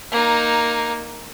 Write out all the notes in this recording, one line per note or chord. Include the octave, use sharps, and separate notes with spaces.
A#3 D#4